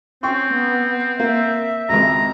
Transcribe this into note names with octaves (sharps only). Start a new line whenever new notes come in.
C4 C#4 G5 C6 C#6
B3
A#3 E5
G#1 C#2 A#5